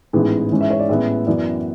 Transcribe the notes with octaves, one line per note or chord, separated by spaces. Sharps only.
A1 G#2 E3 B3 G#4
G#2 E3 G#3 C#4
E5
C#5
D5
A1 A2 G#3 B3 E5
F#2 E3 B3 D5